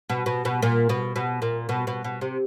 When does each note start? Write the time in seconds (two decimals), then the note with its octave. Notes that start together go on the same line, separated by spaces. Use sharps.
0.10 B2
0.26 B2
0.45 B2
0.62 A#2
0.89 B2
1.16 B2
1.42 A#2
1.69 B2
1.87 B2
2.04 B2
2.21 C3